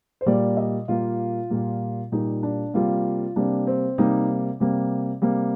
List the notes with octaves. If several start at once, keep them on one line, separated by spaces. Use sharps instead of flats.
C5
A#2 G3 A#3 D5
D#5
A#2 G3 A#3 F4
A#2 G3 A#3
A#2 G3 A#3 D#4
D4
C3 G3 A#3 F4
C3 G3 A#3 D4
C4
C3 G3 A#3 D#4
C3 G3 A#3
C3 G3 A#3